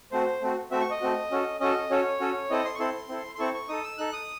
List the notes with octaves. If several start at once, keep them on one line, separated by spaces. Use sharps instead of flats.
A3 C4 F#4 C5
A3 C4 F#4
A3 C4 F#4 E5
C#6
D#5
A3 C4 F#4
C#4 F#4 A4
C#4 F#4 A4 D#5
C#4 F#4 A4 C#5
C#4 F#4 A4
C4 E4 A4 D#5
C6
C#6
C4 E4 A4 C6
C4 E4 A4
C6
C4 E4 A4 C#6
C#6
D#4 A4 D#6
E6
D#4 A4 F#6
D#6